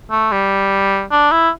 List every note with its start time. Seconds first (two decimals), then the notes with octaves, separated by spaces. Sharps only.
0.11 A3
0.32 G3
1.12 D4
1.32 E4